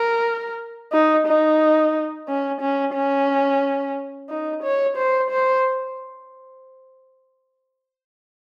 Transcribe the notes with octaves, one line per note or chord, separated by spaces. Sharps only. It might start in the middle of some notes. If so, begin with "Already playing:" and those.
Already playing: A#4
D#4
D#4
C#4
C#4
C#4
D#4
C#5
C5
C5